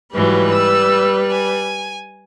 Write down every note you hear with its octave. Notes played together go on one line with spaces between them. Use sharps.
G#2 E3 F#3 G3 B4
E6
G#5